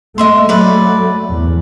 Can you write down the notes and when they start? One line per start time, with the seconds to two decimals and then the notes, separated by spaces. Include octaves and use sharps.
0.18 A3 D#5 E5 C6
0.49 F#3 A3 B4 D5
1.29 E2